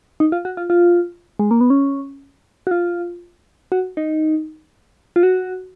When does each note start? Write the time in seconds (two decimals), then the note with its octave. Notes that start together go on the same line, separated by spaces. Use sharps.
0.20 D#4
0.32 F4
0.45 F#4
0.57 F4
0.70 F4
1.39 G#3
1.51 A#3
1.61 B3
1.70 C#4
2.67 F#4
2.71 F4
3.72 F#4
3.97 D#4
5.16 F4
5.23 F#4